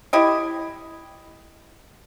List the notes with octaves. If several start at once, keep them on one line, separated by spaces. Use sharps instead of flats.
E4 G4 D#5